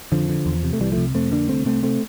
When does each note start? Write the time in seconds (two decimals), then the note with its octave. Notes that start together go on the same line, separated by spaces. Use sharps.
0.12 F2 D3 F3
0.29 D3
0.46 E2
0.63 C3
0.73 A3
0.80 C2 E3 G3
0.92 F3 A3
0.97 C3
1.14 F2 A3 C4
1.31 D3 A#3 D4
1.49 C2 A3 C4
1.65 C3 A3 C4
1.83 A3 C4